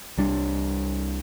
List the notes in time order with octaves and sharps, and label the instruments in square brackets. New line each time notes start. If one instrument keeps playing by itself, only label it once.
[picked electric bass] C2 G3 D4